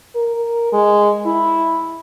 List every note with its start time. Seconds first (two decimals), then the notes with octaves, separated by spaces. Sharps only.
0.15 A#4
0.73 G#3
1.26 E4